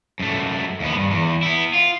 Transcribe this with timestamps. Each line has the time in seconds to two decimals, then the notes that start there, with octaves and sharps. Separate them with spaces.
0.19 F#2 A3
0.80 D#2 B3
0.95 G2
1.11 E2
1.43 B3 E4
1.74 F4